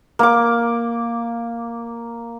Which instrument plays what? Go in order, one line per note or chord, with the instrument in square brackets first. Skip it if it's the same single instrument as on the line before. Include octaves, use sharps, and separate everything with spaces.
[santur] A#3 D6